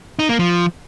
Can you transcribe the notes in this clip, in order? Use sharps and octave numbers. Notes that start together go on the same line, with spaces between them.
D#4
A#3
F3